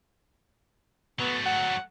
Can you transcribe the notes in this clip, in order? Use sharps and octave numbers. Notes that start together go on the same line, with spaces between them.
F#3 A3 B3
F#5